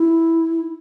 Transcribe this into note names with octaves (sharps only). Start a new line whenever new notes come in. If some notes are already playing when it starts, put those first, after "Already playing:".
Already playing: E4